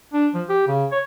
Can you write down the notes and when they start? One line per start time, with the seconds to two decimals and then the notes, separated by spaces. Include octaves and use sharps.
0.14 D4
0.34 F3
0.49 G4
0.68 C#3
0.92 C#5